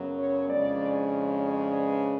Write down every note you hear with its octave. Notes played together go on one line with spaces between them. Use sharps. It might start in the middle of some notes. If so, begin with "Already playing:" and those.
Already playing: F#2 C#3 F#3 B3
C#5
F2 C#3 G#3 D4 D5
C#5
B4